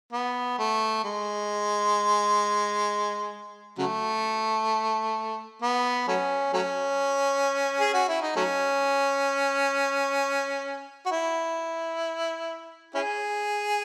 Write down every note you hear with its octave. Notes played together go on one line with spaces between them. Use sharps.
B3
A3
G#3
C#3 F#3 A3
B3
F#3 A3 C#4
F#3 A3 C#4
G#4
F#4
E4
D#4
F#3 A3 C#4
F#4
E4
C#4 E4 G#4